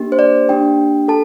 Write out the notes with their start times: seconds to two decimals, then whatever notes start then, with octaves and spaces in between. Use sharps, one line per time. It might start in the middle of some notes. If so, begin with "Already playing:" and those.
Already playing: A#3 D4 G4
0.12 C5
0.19 D5
0.48 A#3 D4 G4 G5
1.08 A4 A5